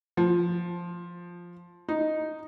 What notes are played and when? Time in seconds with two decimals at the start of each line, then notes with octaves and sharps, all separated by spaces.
0.17 F3
1.88 D#4